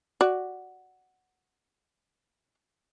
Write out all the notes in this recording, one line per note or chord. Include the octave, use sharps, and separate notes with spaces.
F#4 D5